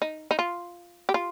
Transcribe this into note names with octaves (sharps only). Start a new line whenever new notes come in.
D#4
D#4
F4
G4
F4